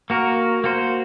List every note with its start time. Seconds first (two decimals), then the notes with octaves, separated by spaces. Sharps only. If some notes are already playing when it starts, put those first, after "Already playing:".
0.10 A#3 F#4 A#4
0.64 A#3 F#4 C5